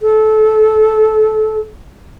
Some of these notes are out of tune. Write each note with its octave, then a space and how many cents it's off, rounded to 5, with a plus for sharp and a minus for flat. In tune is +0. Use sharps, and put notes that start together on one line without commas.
A4 -20